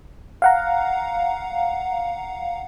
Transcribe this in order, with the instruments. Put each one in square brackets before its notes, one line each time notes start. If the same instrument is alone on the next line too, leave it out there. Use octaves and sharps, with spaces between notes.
[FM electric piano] F5 F#5 A#5